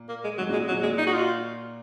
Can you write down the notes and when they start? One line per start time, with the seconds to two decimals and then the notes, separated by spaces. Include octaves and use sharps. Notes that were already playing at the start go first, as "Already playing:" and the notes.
Already playing: A#2
0.09 A#3
0.24 G#3
0.38 G#2 F#3
0.49 A#2 G#3
0.68 F#3
0.72 A#2
0.83 A#2 G#3
0.98 D#4
1.07 F#4
1.13 F4